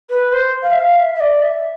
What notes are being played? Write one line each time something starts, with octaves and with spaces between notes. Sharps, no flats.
B4
C5
F5
E5
F5
E5
E5
D5
E5